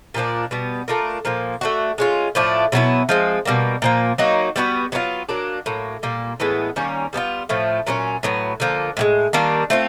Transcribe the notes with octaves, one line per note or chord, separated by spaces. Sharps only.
A#2 F3 A#3 D4
B2 G3 B3
A3 D4 F4 A#4
A#2 F3 A#3
A3 D4 F#4
G#3 C#4 F4
A2 F3 A3 D4
B2 F#3 B3 E4
F3 G#3 C4
B2 G3 A#3
A#2 F3 A#3
F#3 A#3 D#4 F#4
G3 B3 D4 F#4
F#3 B3 D4 F4
F#3 A#3 D4
A2 F#3 A#3
A#2 G3 A#3
A2 E3 G#3 B3
D#3 G3 A#3 C#4
G3 B3 D4 F4
A2 F3 A3
A#2 F#3 A#3 C#4
A2 F#3 B3
D3 F3 A#3
A2 F3 G#3
D#3 G3 A#3 D4
A3 C4 F4